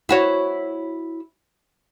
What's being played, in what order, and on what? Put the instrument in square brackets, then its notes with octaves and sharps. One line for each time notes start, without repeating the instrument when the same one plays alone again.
[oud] E4 F#4 C#5